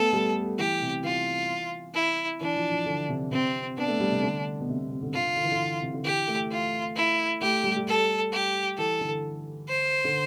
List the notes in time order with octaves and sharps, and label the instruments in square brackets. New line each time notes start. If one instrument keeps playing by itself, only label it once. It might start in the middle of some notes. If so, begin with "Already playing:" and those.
Already playing: [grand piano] A3 B3 [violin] A4
[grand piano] G3
[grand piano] E3 [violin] G4
[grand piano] C3
[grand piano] E3 [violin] F4
[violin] E4
[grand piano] E3 [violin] D4
[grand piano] F3
F3
D3
C3
[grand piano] C3 [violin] C4
[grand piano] B3 [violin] D4
[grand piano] A3
G3
C3
D3
B2
C3
B2
C3
D3
[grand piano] D3 [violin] F4
[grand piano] D3
E3
D3
C3
D3
[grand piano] E3 [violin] G4
[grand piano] A3
[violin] F4
E4
[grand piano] A3 [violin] G4
[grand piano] G3
G3
[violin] A4
G4
[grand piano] E3 [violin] A4
[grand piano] D3
[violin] C5
[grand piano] D3